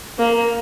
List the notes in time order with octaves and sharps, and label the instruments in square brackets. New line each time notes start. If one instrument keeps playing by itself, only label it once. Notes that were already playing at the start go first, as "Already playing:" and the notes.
[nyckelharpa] A#3